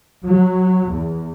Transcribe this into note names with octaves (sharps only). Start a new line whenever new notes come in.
F#3
E2